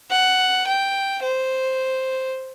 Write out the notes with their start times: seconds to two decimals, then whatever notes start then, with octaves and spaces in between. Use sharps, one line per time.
0.10 F#5
0.67 G5
1.23 C5